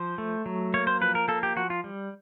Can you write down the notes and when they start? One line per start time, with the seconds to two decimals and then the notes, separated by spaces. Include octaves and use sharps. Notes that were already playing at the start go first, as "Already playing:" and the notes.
Already playing: F3 C5
0.18 A3
0.46 F#3
0.74 A#3 C#5
0.87 C5
1.01 F3 B4
1.15 A#4
1.28 A#3 A4
1.43 G4
1.56 F3 F#4
1.70 F4
1.84 G3